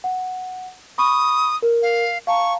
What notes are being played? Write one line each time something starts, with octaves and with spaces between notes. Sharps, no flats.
F#5
B5 C#6 D#6
A#4
F5
F5 A5 A#5 C#6